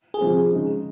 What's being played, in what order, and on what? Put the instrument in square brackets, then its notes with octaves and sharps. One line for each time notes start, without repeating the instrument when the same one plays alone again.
[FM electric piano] G#4
[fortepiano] C3 F3 C4
C#3 G#3 D#4